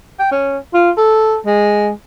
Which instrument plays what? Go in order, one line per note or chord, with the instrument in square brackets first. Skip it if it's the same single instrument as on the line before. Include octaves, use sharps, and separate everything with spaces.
[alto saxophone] G5
C#4
F4
A4
G#3